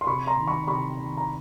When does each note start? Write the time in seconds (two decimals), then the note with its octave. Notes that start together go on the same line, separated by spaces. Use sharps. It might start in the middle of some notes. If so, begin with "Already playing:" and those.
0.01 C6
0.07 C3 B5 C#6
0.27 A#5 C6
0.37 D#3
0.47 B5 C#6
0.67 C3 B5 C#6
0.98 D#3
1.17 A#5